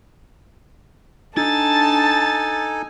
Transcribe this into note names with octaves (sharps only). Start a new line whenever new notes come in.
D4 D#4 A4 G#5 A5 A6